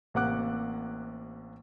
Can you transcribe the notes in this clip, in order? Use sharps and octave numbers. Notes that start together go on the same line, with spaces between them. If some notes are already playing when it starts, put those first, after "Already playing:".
A1 C3 A#3 F#5 D6 F#6